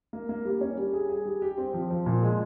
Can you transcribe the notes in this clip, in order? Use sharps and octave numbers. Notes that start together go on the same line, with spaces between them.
A#3
A#3
G3
C#4
G3
G#4
G#4
G3
G4
C4
F3
F3
A#2
G#3